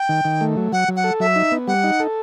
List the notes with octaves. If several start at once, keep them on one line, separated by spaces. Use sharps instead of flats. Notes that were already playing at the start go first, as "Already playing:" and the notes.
Already playing: G5
D#3
D#3
A3
F#3
F#3 F#5
F#3
F#5
A4
F#3 E5
D#4
B3
G3 F#5
D#4
A4